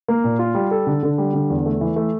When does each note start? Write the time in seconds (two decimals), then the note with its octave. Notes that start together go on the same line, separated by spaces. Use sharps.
0.08 A#3
0.24 A#2
0.39 F4
0.55 G3
0.71 A4
0.87 D3
1.03 D3
1.18 G3
1.34 D3
1.50 E2
1.66 A3
1.81 E3
1.96 A3